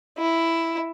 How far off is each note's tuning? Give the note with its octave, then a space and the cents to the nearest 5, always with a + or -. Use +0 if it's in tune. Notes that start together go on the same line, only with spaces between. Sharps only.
E4 +5